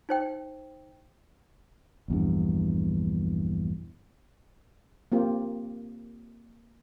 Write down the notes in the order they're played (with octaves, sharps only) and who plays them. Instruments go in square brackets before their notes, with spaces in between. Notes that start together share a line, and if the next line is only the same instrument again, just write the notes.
[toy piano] D#4 C5 G5
[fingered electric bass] A#1 E2 G2
[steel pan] A#3 C4 F4 G4